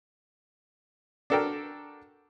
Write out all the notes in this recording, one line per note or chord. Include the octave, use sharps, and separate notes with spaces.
D4 F#4 A4 A#4 G5